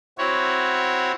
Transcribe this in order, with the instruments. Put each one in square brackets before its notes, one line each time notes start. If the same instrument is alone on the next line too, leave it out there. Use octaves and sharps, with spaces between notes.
[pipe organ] C4 E4 F#4 C#5